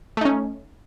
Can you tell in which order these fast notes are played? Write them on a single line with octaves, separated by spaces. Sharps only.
A3 D#4 C#4